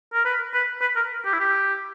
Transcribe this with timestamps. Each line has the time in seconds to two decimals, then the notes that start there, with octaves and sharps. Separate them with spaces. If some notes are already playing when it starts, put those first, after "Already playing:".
0.14 A#4
0.25 B4
0.54 B4
0.81 B4
0.96 A#4
1.25 G4
1.33 E4
1.40 G4